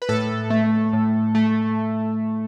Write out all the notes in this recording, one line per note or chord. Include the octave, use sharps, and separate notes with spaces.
B4
A2 A4
A3
A2
A3